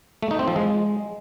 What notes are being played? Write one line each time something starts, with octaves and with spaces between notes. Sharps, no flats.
A3
D#4
C4
F3
G#3